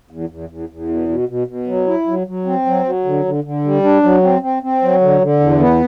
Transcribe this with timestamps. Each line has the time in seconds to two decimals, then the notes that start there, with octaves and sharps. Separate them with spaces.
0.11 E2
0.29 E2
0.49 E2
0.69 E2
0.88 B2
1.09 B2
1.29 B2
1.47 B2
1.67 F#3
1.87 E4
2.07 F#3
2.27 F#3
2.45 C4
2.65 F#3
2.85 F#3
3.05 D3
3.25 D3
3.44 D3
3.64 G3
3.83 D4
4.03 F#3
4.23 C4
4.42 C4
4.63 C4
4.82 F#3
5.01 D3
5.22 D3
5.40 E2
5.60 B3